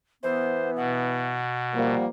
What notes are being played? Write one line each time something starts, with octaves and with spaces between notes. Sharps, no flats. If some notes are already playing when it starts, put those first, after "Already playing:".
E3 B3 C5
B2 F#5
F3 G3 A#3